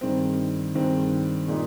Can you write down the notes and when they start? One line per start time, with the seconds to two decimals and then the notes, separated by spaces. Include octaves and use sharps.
0.01 G2 D#3 G#3 C4
0.75 G2 D#3 G#3 C4
1.48 A#2 G#3 D#4